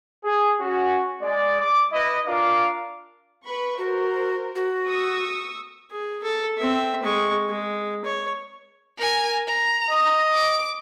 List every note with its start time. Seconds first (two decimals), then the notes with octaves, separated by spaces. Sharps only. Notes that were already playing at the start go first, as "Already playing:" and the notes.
0.25 G#4
0.60 C#4 F#4
1.22 G#3 D5
1.61 D6
1.93 E4 B4 D#5
2.27 D4 F4 A#4 F5 D6
3.45 B4 B5 C#6
3.78 F#4 A#4 C5
4.55 F#4
4.88 C#6 D#6 E6
5.91 G#4
6.23 A4
6.57 C4 E5
7.03 G#3 C#6
7.49 G#3
8.05 C#5
8.97 A#4 G#5
9.47 A#5
9.91 D#5
10.32 D6 D7